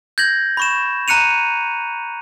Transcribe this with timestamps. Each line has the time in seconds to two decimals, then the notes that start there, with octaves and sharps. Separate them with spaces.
0.18 G6 G#6 A#6 F#7
0.57 B5 C#6 E7
1.08 A#5 F#6 C#7 D#7 F7